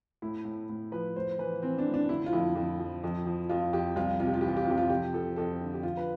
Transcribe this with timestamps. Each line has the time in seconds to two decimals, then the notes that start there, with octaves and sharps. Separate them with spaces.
0.22 A2 E4
0.45 A2
0.69 A2
0.92 F3 B4
1.16 A2 C5
1.38 E3 B4
1.62 E3 C4
1.78 D4
1.86 A2
1.94 D4
2.09 D3 E4
2.26 F4
2.33 F2 E4
2.55 F2
2.79 F3
3.04 F2
3.26 F3
3.49 F2 F4
3.73 F2 G4
3.96 C2 F4
4.20 C3 F4
4.27 G4
4.34 F4
4.41 E3 G4
4.48 F4
4.56 G4
4.64 F4
4.67 C3 G4
4.78 F4
4.90 F2 G4
5.13 F3 A4
5.36 F2 A4
5.61 D3
5.73 G4
5.83 F3 F4
5.97 B4